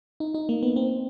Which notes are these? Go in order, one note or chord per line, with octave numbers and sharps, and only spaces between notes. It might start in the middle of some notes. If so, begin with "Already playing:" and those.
D#4
D#4
A#3
B3
C4